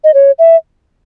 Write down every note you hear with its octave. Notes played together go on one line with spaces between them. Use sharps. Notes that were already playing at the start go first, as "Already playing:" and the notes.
D#5
C#5
E5